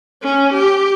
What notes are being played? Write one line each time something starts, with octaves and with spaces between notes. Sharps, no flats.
C#4
G4